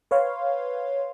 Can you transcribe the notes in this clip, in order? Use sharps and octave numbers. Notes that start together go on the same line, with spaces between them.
B4 C#5 F5 C6